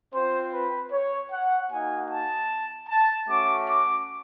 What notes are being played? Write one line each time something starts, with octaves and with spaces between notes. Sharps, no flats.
C4 F4 C5
B4
C#5
F#5
A#3 D#4 F#4 G#5
A5
A5
A3 C#4 F#4 D6
D6